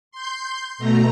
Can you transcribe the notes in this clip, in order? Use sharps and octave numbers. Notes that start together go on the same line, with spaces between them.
C6 G6
B2 A3 A#5